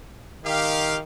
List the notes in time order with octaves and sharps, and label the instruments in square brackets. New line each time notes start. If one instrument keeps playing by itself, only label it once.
[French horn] D#3 [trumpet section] G4 F5